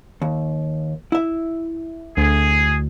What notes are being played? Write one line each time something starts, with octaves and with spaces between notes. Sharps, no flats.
D#2
E4 E5
D2 G#4